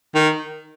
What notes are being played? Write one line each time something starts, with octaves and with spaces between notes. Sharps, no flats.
D#3